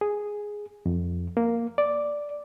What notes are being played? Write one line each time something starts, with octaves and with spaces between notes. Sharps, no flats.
G#4
F2
A#3
D5